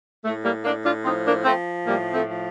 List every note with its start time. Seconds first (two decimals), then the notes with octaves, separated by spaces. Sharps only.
0.24 A2 A3
0.44 G3 A#3
0.64 A2 A#3 D4
0.84 D4 F4
1.04 F3 C4 D#4
1.25 A#3 D4
1.45 F3 A3 C4
1.86 A2 G3 A#3
2.13 A3 C4
2.27 F3